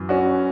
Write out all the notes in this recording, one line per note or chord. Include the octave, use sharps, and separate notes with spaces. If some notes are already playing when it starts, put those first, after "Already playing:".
Already playing: F#2 E3
C#4 F#4